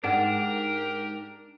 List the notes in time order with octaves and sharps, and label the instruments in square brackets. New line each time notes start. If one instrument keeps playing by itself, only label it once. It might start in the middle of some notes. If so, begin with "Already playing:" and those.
[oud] G#2 [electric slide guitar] D4 [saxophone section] G4 A#4 [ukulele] G#4 F#5